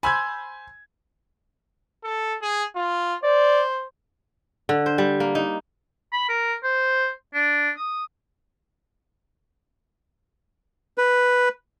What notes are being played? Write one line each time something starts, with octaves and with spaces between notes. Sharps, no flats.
C5 G#5 B5 E6 G#6
A4
G#4
F4
C5 D5
D3
C5
G3
A#3
D#4
B5
A#4
C5
D4
D#6
B4